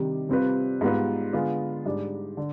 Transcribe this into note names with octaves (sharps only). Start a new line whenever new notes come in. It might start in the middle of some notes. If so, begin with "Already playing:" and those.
Already playing: C3 D#3 G3 D4
C3 G3 C4 F4 B4
G#2 G3 B3 F4 B4
D3 G#3 B3 F4
G#2 G3 D4
D3